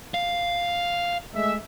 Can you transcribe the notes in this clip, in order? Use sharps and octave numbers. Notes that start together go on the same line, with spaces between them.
F5
G#3 A3 E5